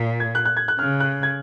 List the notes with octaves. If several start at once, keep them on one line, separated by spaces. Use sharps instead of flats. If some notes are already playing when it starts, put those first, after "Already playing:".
Already playing: A#2
G#6
F#6
F#6
G#6
F#6
C#3 F6
F#6
G#6